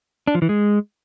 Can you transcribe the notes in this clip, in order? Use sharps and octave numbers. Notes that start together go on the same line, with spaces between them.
D4
F3
E3
G#3